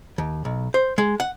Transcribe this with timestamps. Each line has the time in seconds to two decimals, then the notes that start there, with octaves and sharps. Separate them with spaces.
0.18 D#2
0.45 B1
0.74 C5
0.98 G#3
1.20 F#5